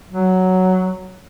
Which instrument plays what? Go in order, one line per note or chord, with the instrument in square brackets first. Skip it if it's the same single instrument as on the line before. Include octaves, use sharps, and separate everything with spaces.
[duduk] F#3